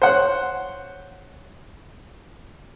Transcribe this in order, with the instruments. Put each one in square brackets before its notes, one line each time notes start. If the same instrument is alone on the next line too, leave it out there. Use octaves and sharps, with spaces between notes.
[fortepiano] C5 C#5 F#5